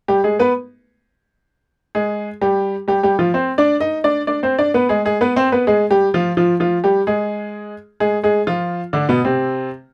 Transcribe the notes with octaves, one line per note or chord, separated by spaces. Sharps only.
G3 G4
G#3 G#4
B3 B4
G#3 G#4
G3 G4
G3 G4
G3 G4
F3 F4
C4 C5
D4 D5
D#4 D#5
D4 D5
D4 D5
C4 C5
D4 D5
B3 B4
G#3 G#4
G#3 G#4
B3 B4
C4 C5
B3 B4
G#3 G#4
G3 G4
F3 F4
F3 F4
F3 F4
G3 G4
G#3 G#4
G#3 G#4
G#3 G#4
F3 F4
D3 D4
B2 B3
C3 C4